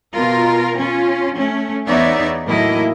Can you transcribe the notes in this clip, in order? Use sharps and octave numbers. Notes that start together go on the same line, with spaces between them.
B2 F4 A#4
C#4 F4
A3 C#4
E2 B3 D#4 C#5 D5 E5
A2 D#3 F#3 A#3 E4 D#5